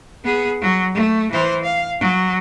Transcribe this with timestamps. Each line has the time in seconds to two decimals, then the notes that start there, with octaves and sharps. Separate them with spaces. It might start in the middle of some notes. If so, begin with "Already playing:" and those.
0.24 B3 G#4
0.61 F#3
0.94 A3
1.32 E3 C5
1.64 F5
2.00 F#3